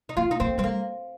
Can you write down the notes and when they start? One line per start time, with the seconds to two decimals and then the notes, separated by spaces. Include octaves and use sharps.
0.09 D#4
0.17 A#3 F4
0.31 D#4
0.40 A#3 C4
0.58 G3 C4
0.64 A#3